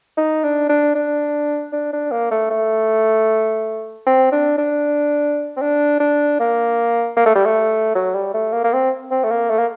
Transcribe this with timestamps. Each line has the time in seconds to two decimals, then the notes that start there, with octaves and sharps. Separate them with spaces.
0.17 D#4
0.44 D4
0.69 D4
0.95 D4
1.73 D4
1.93 D4
2.11 A#3
2.31 A3
2.50 A3
4.06 C4
4.32 D4
4.58 D4
5.57 C4
5.61 D4
6.00 D4
6.40 A#3
7.17 A#3
7.26 A3
7.35 G3
7.46 A3
7.95 F#3
8.14 G3
8.34 A3
8.53 A#3
8.64 A#3
8.73 C4
9.11 C4
9.24 A3
9.31 A#3
9.50 A3
9.59 A#3